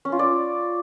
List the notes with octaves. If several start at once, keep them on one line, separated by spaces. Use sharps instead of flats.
C#4
F4
D5